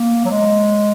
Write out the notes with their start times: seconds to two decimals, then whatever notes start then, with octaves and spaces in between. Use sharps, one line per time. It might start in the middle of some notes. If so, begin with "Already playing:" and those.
Already playing: A#3
0.25 F#3
0.31 G#3